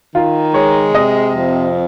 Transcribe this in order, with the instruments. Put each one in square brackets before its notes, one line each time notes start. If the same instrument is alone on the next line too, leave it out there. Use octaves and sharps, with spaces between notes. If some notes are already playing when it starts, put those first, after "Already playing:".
[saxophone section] D#3 [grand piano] F4
[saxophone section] G#3 [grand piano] C#5
[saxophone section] C3 [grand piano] D#5
[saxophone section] F2